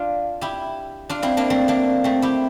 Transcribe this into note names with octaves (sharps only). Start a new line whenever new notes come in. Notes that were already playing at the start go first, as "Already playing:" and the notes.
Already playing: D4 F4
E4 G4
D4 F4
C4 E4
A#3 D4
A3 C4
A#3 D4
A3 C4
E4 G4